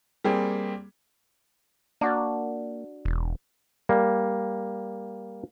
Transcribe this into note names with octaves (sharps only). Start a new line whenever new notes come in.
G3 A#3 C4 G#4
A#3 D4 F#4 D5
E1
G3 A#3